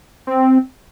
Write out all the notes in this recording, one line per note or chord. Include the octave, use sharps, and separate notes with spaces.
C4